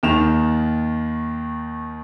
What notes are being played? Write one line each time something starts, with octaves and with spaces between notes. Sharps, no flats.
D#2 D#3 E7 F7